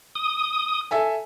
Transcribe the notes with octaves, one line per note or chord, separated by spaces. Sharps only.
D#6
A4 E5 G#5